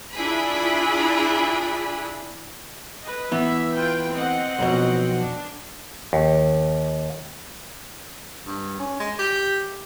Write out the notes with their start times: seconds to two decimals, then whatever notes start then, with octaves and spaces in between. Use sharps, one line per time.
0.15 D4 E4 F4 G#4 B5
3.02 B4 D#5
3.32 E3 B3 E5
3.77 F4 B4 G5
4.11 C4 D#5 F#5
4.59 B1 F2 B2
5.20 D4
6.13 D#2
8.47 G2
8.80 C#4
9.00 G#3
9.19 G4